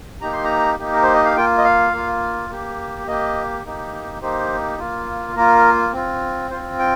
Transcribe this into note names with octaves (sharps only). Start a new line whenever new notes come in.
A#3 D#4 G4 A#5
C6
A#5
A#3 D#4 G4
A#4
C5
D#5
F5
A#3 F4 G5
D#5
F5
A#3 F4
A#3 G4
A#3 G4 D#5
A#3 D#4 G4
A#3 D#4 G4 C5
A#3 F4
A#3 F4 A#4
C4 F4
C4 F4 C5
G5